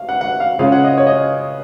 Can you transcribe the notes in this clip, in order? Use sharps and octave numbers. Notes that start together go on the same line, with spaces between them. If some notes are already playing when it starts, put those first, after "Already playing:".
Already playing: F5
F#5
F#5
F5
C#3 G#3 C#4 F4 F5
F#5
D#5
C#5
D#5